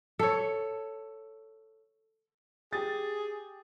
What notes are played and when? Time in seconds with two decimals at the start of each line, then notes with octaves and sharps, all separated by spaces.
0.19 A4 C#5
2.73 G4 G#4 A6